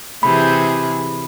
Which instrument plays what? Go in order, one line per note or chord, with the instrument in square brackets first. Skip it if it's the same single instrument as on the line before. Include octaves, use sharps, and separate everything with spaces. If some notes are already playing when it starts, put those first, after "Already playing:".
[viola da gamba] C3 E3 G#4 [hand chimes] B5